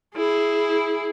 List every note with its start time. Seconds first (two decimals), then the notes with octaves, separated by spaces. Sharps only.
0.15 E4 G#4